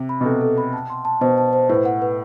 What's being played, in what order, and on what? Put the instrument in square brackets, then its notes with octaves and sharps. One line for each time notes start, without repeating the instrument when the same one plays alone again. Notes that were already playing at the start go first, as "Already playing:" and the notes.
Already playing: [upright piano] C3
[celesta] B5
[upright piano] B2
[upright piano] C3 [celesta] A4
[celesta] A4
B5
A5
C6
A5
[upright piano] B2 [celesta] C5
[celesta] A5
C5
[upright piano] A2 [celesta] B4
[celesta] F#5
B4